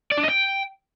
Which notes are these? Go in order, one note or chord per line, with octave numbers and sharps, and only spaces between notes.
D5
D4
D#5
G5